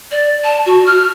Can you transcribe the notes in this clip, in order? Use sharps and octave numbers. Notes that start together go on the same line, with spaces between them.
D5
A5
F#4
F6